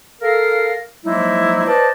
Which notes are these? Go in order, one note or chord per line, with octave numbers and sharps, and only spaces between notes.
A4 A#4 F5
F3 F#3 G#3 A#3 D#4 E4
B4 C5 D5 D#5 A5